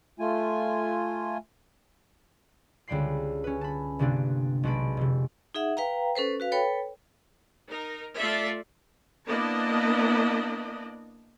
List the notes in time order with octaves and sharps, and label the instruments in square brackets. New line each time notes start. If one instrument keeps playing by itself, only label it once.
[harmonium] A3 F4 G#5
[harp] C#2 D3 G3 G5 B5 C7
C#4 B4
A5 B5
G1 C3 A#3 D4
B1 G#3 F#4 A5 B5 D7
F1 C3
[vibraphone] D#4 G#4 E5 F#5
B4 F5 G5 A#5
C#4 A4 B4 C5
F#4 B4 F5
A4 B4 C#5 G5 B5
[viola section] D#4 A#4
A3 F4 A4 D5 E5
A#3 B3 D4 E4 D5 D#5